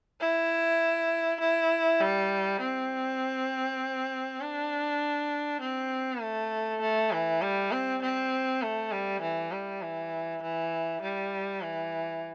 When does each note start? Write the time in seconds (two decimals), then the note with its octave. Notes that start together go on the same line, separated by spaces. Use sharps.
0.21 E4
1.40 E4
2.01 G3
2.61 C4
4.41 D4
5.61 C4
6.22 A3
6.81 A3
7.12 E3
7.42 G3
7.72 C4
8.02 C4
8.62 A3
8.92 G3
9.22 E3
9.52 G3
9.82 E3
10.42 E3
11.02 G3
11.62 E3